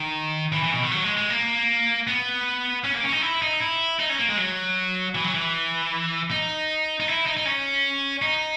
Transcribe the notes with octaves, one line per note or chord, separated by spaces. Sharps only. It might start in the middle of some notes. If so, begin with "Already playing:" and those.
Already playing: D#3
E3
E3
B2
D#3
F#3
G#3
G#3
A#3
B3
C#4
A#3
C#4
D#4
E4
D#4
E4
D#4
C#4
A#3
G#3
F#3
E3
F#3
E3
D#4
D#4
E4
D#4
D#4
C#4
D#4